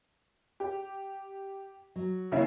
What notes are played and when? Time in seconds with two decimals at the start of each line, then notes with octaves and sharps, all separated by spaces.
0.60 G4
1.96 F#3
2.32 D#2 C#3 E4